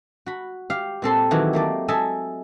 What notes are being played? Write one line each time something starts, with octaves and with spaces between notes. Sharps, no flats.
F#4 B5
G4 F5
A#2 C4 A4 C6
D#3 E3 F#3 F#4 G4
A3 A#3 D5
A4 D#5 E5 G#5 A5